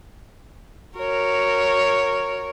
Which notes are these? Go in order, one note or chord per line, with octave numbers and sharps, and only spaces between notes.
F#4 A#4 C#5